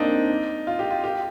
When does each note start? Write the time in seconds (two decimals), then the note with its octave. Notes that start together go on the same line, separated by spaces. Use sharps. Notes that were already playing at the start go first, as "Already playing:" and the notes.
Already playing: A#3 C4 D4 D#4
0.67 F4
0.79 G4
0.91 F4
1.04 G4